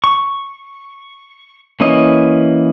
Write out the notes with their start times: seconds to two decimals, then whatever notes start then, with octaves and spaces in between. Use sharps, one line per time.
0.04 C#6
1.80 E3 A#3 C#4 E4 D#5